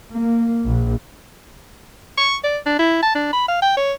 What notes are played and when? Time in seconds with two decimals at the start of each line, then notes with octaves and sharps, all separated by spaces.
0.11 A#3
0.65 A#1
2.18 C#6
2.44 D5
2.66 D4
2.79 E4
3.02 A5
3.15 D4
3.33 B5
3.48 F5
3.62 G5
3.77 C#5